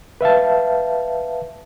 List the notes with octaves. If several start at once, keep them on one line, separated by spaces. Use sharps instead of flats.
B4 E5 F5 A5